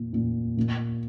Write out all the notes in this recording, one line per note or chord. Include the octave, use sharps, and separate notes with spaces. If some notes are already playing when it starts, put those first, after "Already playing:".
Already playing: A#2
A#2
A#2